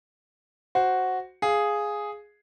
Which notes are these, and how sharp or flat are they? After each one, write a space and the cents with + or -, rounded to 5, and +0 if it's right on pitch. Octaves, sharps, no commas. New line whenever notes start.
F#4 +0 C5 +0
G#4 +0 F5 +0